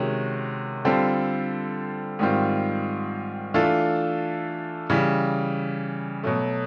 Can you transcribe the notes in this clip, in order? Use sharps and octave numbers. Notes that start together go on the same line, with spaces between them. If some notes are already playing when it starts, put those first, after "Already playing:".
Already playing: C3 D#3 G#3 C#4 F#4
D3 G3 C4 F4 A4
G#2 D#3 G3 C4 F4
E3 A3 D4 F4 A4
C#3 E3 G3
B2 F#3 A3